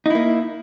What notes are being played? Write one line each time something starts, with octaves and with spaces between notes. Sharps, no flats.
A#3 D#4 E4